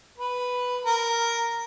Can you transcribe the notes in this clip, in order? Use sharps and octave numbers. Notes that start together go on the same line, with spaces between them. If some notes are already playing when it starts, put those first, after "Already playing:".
B4
A#4